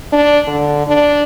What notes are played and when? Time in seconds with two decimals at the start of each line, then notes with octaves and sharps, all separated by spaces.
0.13 D4
0.47 D3
0.88 D4